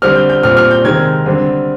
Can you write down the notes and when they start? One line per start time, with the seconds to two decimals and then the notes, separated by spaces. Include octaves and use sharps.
0.02 D3 G3 C4 F6
0.16 G6
0.30 G6
0.43 A#2 G3 C4 F6
0.57 F6
0.71 G6
0.84 C3 D#3 G#3 C4 G#6
1.26 D3 G3 C4